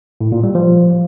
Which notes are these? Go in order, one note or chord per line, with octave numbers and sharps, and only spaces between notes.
A2
A#2
G3
F3